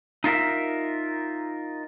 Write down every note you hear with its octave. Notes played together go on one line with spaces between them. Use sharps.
D#4 F4 A#4 E5